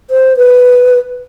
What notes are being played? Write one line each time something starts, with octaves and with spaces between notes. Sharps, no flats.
C5
B4